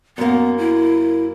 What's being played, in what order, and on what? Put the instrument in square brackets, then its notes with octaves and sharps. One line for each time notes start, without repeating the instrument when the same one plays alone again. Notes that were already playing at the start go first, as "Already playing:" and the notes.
[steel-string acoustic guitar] F#2 A#3 [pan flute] B3
[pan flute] E4